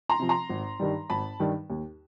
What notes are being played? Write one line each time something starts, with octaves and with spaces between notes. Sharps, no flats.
A#5 C6
C3 F3
A#5 C6
G#1
G2 D#3 G3
G#1 A5 B5
G2 D#3 G3
D#2